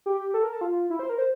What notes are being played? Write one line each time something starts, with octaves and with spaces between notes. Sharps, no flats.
G4
A4
A#4
A4
F4
E4
C5
A#4
C5